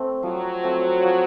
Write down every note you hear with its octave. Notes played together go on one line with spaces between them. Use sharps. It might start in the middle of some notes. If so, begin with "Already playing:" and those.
Already playing: A3 C4
F3 F#3
A3 C4
F3